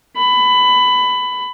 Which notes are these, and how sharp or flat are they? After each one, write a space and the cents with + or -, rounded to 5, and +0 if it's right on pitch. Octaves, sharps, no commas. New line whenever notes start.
B5 +20